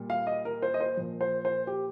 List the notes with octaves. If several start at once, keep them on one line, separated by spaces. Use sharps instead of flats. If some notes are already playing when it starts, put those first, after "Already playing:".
Already playing: A#2 G3
F5
D#5
A#4
C5
D#5
C5
A#2 F3
C5
C5
G4